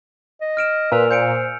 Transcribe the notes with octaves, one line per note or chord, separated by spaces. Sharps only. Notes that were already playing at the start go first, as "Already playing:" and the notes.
D#5
F6 D7 E7
A#2 B4 G#5 E6 F7
C5 G6 C#7 D7